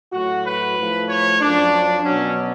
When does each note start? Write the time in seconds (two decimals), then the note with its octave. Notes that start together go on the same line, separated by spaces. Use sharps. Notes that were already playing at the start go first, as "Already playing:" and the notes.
0.13 A2 F#3 F#4
0.45 B4
0.77 A2 F3
1.09 C#5
1.41 F#2 F3 D4
2.04 B2 F#3 C#4